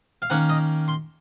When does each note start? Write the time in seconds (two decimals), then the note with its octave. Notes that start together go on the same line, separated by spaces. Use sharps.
0.22 F5
0.30 D#3 A#3 C#4 F#5
0.49 D#5
0.88 C6